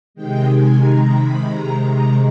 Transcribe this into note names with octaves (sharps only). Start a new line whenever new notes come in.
C3 D#3 G#3 G5
G#5
A#5
B5
A#5
A#5